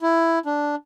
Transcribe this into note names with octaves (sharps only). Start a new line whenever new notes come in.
E4
D4